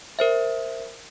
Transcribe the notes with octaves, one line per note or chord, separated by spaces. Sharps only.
A#4 C5 E5